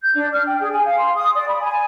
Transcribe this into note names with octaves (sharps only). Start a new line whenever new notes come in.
G6
D4
F6
G5
G#4
G#5
F5
C6
D#6
D5
B5
G#5